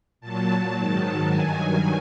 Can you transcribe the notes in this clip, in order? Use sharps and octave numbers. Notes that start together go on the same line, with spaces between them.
A#2 F#3 A5
G#2 D#3 F#3
G2 D#3 F#3 G#5